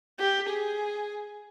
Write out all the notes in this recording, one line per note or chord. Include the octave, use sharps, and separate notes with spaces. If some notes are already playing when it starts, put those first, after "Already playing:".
G4
G#4